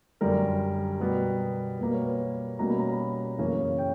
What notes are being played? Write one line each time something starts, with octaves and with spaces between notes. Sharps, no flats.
F#2 D3 G3 A#4
B2 G3 B3
B2 G3 A#3 B4
C#5
B4
B2 G3 A#3 C#4 A#5
B5
A#5
B5
B5
F#2 C#3 E3 A#3 C#4
G5